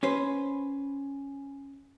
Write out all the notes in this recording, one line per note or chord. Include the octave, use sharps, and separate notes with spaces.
C#4 B4 C5